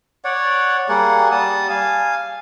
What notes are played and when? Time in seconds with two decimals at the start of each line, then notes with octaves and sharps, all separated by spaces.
0.25 C#5 D5 F#5
0.89 G3 A#3 G#4 F#5
1.31 G3 A5 D#6
1.70 F5 G#5